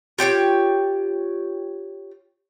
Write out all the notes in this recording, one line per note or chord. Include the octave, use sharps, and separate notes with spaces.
F4 G4 C#5 G5